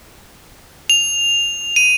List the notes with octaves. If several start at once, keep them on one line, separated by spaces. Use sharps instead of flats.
F7
D#7